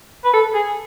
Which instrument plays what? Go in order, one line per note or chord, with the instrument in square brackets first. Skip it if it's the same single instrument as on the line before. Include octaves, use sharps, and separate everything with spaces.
[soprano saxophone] B4
A4
G#4